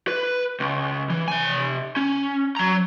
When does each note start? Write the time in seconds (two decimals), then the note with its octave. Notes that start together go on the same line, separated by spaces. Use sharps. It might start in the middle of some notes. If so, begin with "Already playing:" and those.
0.08 B4
0.60 C#2
1.10 E3
1.28 C3 G#5
1.96 C#4
2.57 F#3 A#5